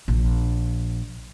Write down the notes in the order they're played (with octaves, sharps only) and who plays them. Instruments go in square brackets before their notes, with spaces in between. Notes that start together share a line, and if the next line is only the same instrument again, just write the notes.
[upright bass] A#1